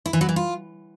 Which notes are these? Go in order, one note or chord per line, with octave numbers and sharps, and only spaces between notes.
E4
E3
F#3
E3
F4